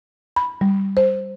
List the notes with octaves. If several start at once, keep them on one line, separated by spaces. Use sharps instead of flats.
B5
G3
C5